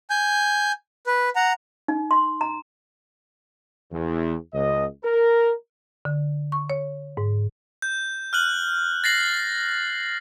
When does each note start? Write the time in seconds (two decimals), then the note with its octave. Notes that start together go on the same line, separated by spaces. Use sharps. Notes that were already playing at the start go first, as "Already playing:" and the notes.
0.10 G#5 G6
1.07 B4
1.36 F#5 A#5
1.88 D#4
2.11 C6
2.41 A#5
3.91 E2
4.53 C#2 D#5
5.04 A#4
6.05 D3
6.52 C#6
6.70 C#5
7.17 G#2
7.82 G6
8.33 F6 F#6 F#7
9.04 A6 A#6 C7 F#7